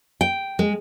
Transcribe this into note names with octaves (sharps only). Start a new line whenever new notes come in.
G5
G#3